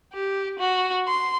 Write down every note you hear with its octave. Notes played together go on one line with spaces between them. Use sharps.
G4
F#4
C6